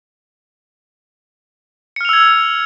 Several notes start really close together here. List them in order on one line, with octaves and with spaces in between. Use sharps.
C#7 F6 F7 E6 G#6